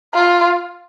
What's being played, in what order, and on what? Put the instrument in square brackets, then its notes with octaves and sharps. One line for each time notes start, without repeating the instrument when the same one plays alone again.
[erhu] F4